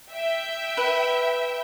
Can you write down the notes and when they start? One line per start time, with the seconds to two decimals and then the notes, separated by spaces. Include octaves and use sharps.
0.11 E5 G5
0.77 B4